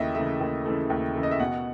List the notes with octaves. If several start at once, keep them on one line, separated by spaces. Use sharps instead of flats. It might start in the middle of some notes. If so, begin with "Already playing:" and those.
Already playing: D#2 C#3 E3 A3 D#5 E5
C#3 E3 A3 E5
D#2
C#3 E3 A3
D#2
C#3 E3 A3
D#5
E5
B2 F#5